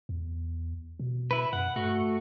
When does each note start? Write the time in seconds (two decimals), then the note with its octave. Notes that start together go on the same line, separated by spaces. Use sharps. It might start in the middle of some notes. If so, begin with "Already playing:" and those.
0.09 E2
1.00 B2
1.31 E4 B4
1.53 F#2 F#5
1.76 G2 A3 F#4